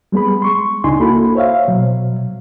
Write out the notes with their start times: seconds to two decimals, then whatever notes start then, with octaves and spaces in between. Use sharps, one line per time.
0.12 G3 G#3 B3 G#4 B5
0.42 C6 C#6
0.84 C#2 D4 D#4 G#5 C6
1.00 A#3 E4 F#4 A4 B5
1.35 C5 C#5 E5 F5
1.68 B2 F#3